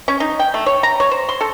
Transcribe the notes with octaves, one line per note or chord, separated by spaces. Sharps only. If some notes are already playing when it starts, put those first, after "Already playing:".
C#4
D#4
G5
A3
C#5
A#5
C#5
C5
C6
A4